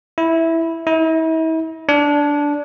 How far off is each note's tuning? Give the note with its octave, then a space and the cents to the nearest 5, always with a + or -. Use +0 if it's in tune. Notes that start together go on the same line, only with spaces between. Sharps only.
E4 -5
E4 -40
D4 -10